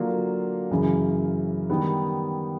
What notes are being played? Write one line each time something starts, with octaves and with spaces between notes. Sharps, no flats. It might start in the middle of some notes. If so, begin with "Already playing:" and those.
Already playing: D3 F#3 A#3 D4 F4
F#2 C#3 E3
D#3 G3 B3 D#4